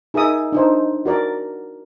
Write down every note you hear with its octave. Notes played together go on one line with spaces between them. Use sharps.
D#4 G#4 A#4 E5 D#6
D4 D#4 C5
F#4 A#4 D5